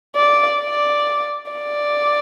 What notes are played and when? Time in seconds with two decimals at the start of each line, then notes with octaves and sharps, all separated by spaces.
0.16 D5
0.61 D5
1.51 D5